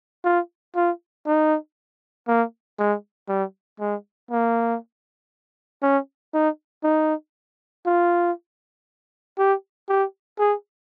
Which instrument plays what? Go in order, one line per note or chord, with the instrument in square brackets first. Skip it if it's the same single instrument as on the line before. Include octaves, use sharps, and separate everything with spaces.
[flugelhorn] F4
F4
D#4
A#3
G#3
G3
G#3
A#3
C#4
D#4
D#4
F4
G4
G4
G#4